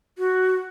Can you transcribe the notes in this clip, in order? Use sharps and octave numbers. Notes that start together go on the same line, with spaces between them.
F#4